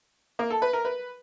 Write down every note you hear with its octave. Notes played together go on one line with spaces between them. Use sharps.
A#3
A4
B4
A#4
B4